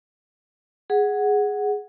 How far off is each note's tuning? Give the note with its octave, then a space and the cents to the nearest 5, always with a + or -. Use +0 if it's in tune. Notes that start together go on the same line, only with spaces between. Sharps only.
G#4 +0 F#5 +0